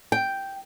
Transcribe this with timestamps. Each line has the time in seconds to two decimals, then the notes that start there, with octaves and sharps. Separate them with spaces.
0.12 G5